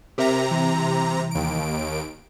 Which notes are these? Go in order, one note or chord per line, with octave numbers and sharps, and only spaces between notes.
C3 G4 A#4 E5 A#5
C2 E3
D#2 D7